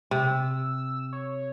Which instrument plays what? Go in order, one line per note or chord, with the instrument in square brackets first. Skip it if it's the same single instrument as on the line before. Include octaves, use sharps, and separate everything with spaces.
[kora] C3 [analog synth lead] E6
[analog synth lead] C#5